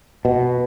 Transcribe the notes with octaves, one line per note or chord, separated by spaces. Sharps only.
B2